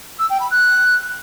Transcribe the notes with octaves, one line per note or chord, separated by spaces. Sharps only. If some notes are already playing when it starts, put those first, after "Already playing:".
E6
G5
B5
F#6